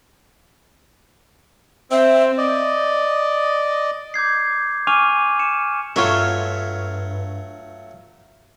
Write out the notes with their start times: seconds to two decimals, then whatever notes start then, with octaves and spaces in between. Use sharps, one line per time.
1.91 C4 E5
2.38 D5 D#5
4.14 D6 G6 G#6 C7
4.87 G#5 C#6 D6 F6 D#7 F7
5.39 C#7 E7
5.96 G2 F#3 A3 F4 C#5 E5